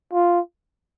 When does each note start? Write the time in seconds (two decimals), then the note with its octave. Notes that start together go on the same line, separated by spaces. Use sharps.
0.13 F4